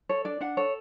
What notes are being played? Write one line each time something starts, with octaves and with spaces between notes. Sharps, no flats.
A4 C#5
D4 D5
D4 F#5
A4 C#5